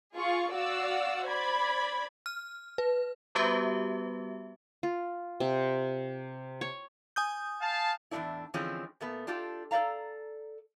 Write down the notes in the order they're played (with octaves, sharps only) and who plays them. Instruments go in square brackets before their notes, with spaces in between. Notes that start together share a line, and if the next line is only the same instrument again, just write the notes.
[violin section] F4 G#4 C#6
F#4 D5 F5 F#5 E6
C5 D5 B5 G#6
[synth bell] F6
B4
G3 B3 F#4 G4 B4 E5
[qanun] F4
C3
C#5
[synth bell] G#5 D#6 G6
[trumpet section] F5 A5
[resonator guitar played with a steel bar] E2 A2 C3 F#3 D4 E4
D3 E3 F3 G#3 C4 C#4
A#2 A3 B3
D4 F4 G4 A4
A4 C5 D5 F5 A#5